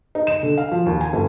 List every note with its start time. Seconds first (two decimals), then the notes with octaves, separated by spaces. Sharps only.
0.15 D#4
0.27 E7
0.43 D3
0.58 F5
0.72 F3
0.86 D#2
1.01 G#5
1.13 G1